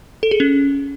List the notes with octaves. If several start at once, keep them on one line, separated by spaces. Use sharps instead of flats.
A4
G#4
C#4